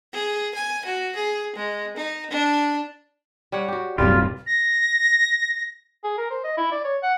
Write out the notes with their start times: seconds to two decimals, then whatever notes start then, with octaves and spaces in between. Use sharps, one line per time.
0.13 G#4
0.54 G#5
0.85 F#4
1.15 G#4
1.55 G#3
1.96 D#4
2.30 D4
3.52 G3 C#5 F#5
3.68 F#4 G4
3.98 D1 G2 C3 F#3 G3 F4 G4 A4
4.47 A#6
6.04 G#4
6.18 A#4
6.30 C5
6.44 D#5
6.57 E4
6.72 D5
6.84 C#5
7.03 F#5